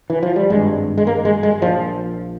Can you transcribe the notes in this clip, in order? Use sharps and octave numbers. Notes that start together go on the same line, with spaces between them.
E3
F3
G3
G#1 G2 G#3
G#3
A#3
G#3
G#3
A#1 A#2 F3